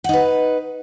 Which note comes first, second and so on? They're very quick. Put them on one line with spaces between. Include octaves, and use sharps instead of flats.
F#5 D#4 B4